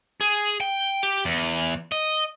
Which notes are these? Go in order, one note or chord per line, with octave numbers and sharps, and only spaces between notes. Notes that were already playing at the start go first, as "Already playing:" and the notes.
G#4
G5
G4
E2
D#5